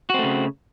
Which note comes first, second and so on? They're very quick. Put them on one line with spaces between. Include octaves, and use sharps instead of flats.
F#4 C4 A3 C#3